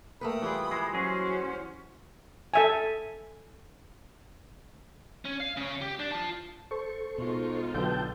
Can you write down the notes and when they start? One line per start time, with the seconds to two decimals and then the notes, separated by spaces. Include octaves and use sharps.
0.21 A3 A#3 B4 G5 B5 D#6
0.42 E3 G3 F4 G#4
0.71 E3 G#3
0.93 F#3 G#3 C#4 F#4 G#4 C5
2.54 A4 E5 G#5
5.25 C#4
5.40 F5
5.57 C#3 C#5
5.81 G4
5.99 D4
6.12 F4 A5
6.71 A4 C5 C#6
7.18 B2 G#3 D#4 F4
7.74 B1 D3 F#3 B3 G5 A5 G6